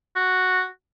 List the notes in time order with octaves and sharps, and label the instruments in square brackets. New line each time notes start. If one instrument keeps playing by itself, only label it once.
[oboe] F#4